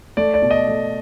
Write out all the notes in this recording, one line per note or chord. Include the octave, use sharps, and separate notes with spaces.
A3 D5
D5
B2
D#5
A3